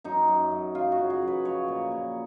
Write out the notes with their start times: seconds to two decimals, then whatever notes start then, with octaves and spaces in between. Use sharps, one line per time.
0.04 F#2 D#4
0.28 F#2
0.51 F#2
0.75 F#2 F4
0.92 F#4
0.98 C#3
1.10 G#4
1.22 F#2
1.27 B4
1.45 F3 C#5
1.68 A#2
1.92 A#2